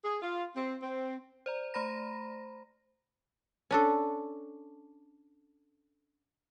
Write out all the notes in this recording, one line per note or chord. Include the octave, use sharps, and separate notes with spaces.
G#4
F4
C4
C4
C5 D5 A#5
A3 C5 A#5 B5 A#6
C#4 D4 A4